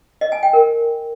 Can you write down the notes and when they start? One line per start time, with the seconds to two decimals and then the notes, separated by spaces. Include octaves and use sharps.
0.21 D#5
0.32 G#5
0.43 G5
0.53 A#4